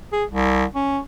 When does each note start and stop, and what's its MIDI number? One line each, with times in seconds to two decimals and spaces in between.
0.13 0.25 68
0.31 0.65 36
0.74 0.99 61